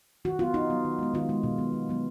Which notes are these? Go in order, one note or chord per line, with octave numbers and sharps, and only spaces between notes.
D#3 F#4
F#3 B3 F4
D#3 D#4
F#3 B3
D#3
G#3 B3
D#3 F4
G#3 B3
B2
F#3 B3
B2
F#3 B3